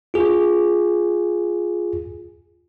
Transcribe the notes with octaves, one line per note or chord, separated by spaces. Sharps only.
F4 G#4